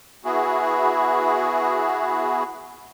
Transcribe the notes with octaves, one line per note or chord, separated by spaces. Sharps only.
B3 E4 F#4 G#4